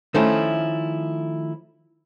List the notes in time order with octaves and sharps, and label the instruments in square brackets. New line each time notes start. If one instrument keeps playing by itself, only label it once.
[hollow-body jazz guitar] D#3 F3 A3 C#4 E4